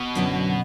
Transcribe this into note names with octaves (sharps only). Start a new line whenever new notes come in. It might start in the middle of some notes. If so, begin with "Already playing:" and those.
Already playing: B2
F#2 D3 F#3 B3 E4